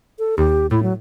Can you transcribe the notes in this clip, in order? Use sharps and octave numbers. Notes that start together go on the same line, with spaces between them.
A4
D#2 G4
A2 E4
F#3